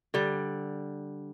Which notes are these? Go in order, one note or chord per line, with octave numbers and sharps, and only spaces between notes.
D3 G3